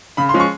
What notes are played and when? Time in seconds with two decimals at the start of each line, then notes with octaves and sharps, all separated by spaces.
0.17 C#3 B5
0.29 C6
0.34 F3 G#3 C#4
0.40 C#6